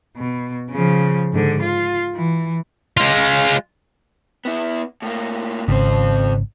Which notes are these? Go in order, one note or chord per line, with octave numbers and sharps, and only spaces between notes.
B2
C#3 F3
G#2 D3
F4
E3
G#3 F4
B3 E4
A2 A#3
G#1 F2 C#3 C5